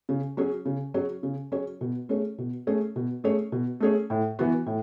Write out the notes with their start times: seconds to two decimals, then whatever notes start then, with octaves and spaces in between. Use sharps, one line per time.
0.09 C#3
0.37 F#3 C#4 G#4 C#5
0.65 C#3
0.94 F#3 C#4 G#4 C#5
1.23 C#3
1.52 F#3 C#4 G#4 C#5
1.81 B2
2.09 A3 C#4 G#4 C#5
2.38 B2
2.67 A3 C#4 G#4 C#5
2.96 B2
3.24 A3 C#4 G#4 C#5
3.52 B2
3.80 A3 C#4 G#4 C#5
4.10 A2
4.39 E3 B3 F#4
4.66 A2